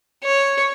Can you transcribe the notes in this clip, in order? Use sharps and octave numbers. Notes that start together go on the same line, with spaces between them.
C#5